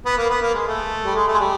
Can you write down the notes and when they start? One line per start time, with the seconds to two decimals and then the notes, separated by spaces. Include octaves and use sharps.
0.05 B3
0.18 A#3
0.30 B3
0.42 A#3
0.54 G#3
0.67 A3
1.05 G3
1.15 G#3
1.28 A3
1.34 G#3
1.40 G3